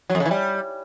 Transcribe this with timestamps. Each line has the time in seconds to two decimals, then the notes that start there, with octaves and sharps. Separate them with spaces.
0.10 F#3
0.15 F2
0.20 C#3
0.26 E3
0.31 G3